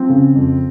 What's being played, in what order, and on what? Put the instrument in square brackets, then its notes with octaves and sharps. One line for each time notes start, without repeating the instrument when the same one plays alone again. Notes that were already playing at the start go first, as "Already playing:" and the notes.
Already playing: [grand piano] F3 C4
C#3
F2